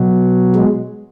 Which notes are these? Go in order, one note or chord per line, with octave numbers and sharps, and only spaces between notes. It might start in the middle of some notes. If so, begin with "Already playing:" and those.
Already playing: B2 F#3
G#3